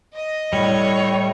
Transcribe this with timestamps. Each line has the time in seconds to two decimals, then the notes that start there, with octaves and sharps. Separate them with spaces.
0.14 D#5
0.53 A2 G3 C#5